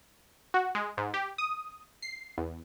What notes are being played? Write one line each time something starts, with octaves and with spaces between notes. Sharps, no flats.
F#4
G#3
G#2
G4
D#6
C7
E2